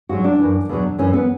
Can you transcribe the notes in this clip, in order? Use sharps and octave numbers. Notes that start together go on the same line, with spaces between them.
G#2 F#3 F#4
D4
F#2 E3
E2 B2 F#3
F#2 E3 C#4
B3